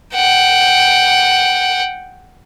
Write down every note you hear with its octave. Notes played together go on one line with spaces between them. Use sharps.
F#5 G5